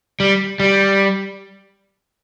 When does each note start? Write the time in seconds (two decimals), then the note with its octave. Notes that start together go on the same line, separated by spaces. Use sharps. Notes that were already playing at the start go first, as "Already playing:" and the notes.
0.20 G3
0.60 G3